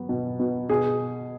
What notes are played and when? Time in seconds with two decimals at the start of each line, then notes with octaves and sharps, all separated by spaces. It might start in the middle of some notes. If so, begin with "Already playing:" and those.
Already playing: F#3 B3
0.09 B2
0.39 B2
0.69 B2 G#4